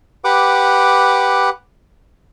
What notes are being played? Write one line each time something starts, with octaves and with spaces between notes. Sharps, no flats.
G4 B4 F#5 D6